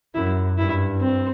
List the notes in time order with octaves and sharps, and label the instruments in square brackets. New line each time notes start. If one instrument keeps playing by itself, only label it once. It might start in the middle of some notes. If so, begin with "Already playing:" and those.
[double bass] F#2 [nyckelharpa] E4
[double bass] G2 [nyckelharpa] E4
[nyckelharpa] C4